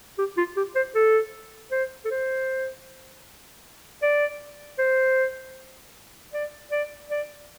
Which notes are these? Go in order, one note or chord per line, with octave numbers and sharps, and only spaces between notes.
G4
F4
G4
C5
A4
C5
A4
C5
D5
C5
D5
D5
D5